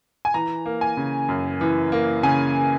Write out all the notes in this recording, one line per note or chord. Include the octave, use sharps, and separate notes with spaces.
G#5
E3 A#5
A#3
G#5
C#3
F#2
E3
A#3
C#3 G#5